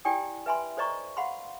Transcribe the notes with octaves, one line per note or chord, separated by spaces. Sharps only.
E4 G4 D5 G5 G#5 D#6
B4 E5 G#5 B5 C6
A4 C5 D5 D#5 A#5 C#6
F5 F#5 B5 C6